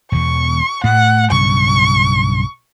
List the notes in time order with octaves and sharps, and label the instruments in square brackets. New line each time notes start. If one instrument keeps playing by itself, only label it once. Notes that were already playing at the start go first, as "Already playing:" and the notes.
[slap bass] E1 E2 [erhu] C#6
[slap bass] A2 A3 [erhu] F#5
[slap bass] B1 G2 C#3 [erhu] C#6